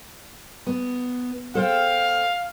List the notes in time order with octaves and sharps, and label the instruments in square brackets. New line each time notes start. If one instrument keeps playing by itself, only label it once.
[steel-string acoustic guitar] B3
[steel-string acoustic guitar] A4 C5 G5 [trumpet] F5